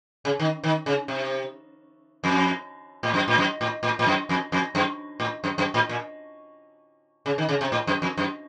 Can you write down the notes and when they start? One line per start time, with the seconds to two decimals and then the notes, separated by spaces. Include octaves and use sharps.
0.25 C#3
0.39 D#3
0.64 D#3
0.86 C#3
1.08 C3
2.24 F2
3.03 A2
3.14 F#2
3.28 A2
3.38 F#2
3.61 A2
3.83 A2
3.99 A2
4.06 F#2
4.29 F2
4.52 F2
4.75 F#2
5.20 A2
5.44 F#2
5.58 F#2
5.74 A2
5.89 A#2
7.26 C#3
7.38 D#3
7.49 C#3
7.61 C3
7.72 A2
7.87 F#2
8.02 F2
8.18 F#2